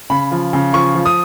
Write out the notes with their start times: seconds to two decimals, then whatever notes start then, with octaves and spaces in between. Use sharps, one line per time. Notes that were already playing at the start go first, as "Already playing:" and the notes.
0.10 C#3 B5
0.31 F3
0.53 C#3
0.73 F3 C#6
0.95 F3
1.05 D#6